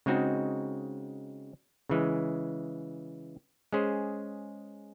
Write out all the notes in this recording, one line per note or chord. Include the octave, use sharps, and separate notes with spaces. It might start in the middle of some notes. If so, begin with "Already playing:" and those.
C#3 G#3 C4 D#4 F#4
C#3 E3 G#3
G#3 C#4 G#4 C5